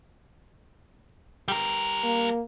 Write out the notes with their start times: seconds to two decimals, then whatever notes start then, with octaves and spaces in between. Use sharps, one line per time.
1.48 G3 A#4
2.04 A#3